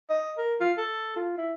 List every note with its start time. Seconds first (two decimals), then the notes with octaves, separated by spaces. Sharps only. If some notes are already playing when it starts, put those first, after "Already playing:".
0.10 D#5
0.38 A#4
0.60 F4
0.78 A4
1.16 F4
1.38 E4